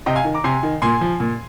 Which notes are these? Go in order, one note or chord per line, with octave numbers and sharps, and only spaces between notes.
C3 D#5 G5
F5 G#5
D#3
A#5 D6
C3 G#5 C6
D#3
A#2 G#5 C6
F3
A#2